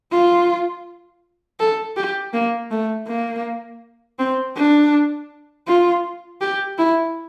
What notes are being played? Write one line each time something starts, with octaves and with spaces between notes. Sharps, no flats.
F4
A4
G4
A#3
A3
A#3
C4
D4
F4
G4
E4